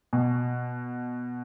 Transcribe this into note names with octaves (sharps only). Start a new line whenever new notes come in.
B2